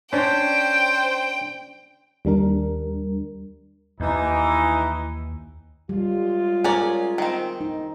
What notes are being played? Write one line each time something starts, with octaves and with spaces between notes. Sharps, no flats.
C#4 D4 C5 G5
D#2 G3 D4 A#4
D#2 E3 D#4
F#2 G3 G#3 F4
C#4 G#4 A#4 D5
D#3 C4
D#4